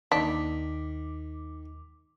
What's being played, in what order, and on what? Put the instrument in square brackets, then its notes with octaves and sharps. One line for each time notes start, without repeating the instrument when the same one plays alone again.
[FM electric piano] D#2 D6 [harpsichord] D#3 [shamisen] D4 [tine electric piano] B6